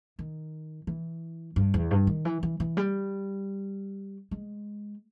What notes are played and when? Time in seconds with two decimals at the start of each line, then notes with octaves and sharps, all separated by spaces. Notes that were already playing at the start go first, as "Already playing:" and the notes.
0.19 D#3
0.87 E3
1.56 G2
1.74 E2
1.91 G2
2.07 D#3
2.25 E3
2.43 E3
2.60 E3
2.77 G3
4.31 G#3